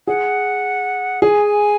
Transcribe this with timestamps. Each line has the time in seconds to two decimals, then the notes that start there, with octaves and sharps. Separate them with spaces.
0.07 G#4 F#5
1.22 G#4 G#5